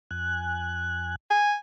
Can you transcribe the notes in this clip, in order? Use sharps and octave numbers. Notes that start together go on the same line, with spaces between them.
F2 G#5 F#6
G#5